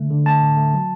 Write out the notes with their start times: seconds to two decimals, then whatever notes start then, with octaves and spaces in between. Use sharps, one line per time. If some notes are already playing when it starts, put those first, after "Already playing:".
Already playing: D3 A3
0.10 D3
0.26 A3 A5
0.42 A2
0.57 A3
0.74 F#3